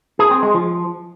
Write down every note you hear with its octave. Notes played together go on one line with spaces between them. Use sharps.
G#4
C4
G#3
F3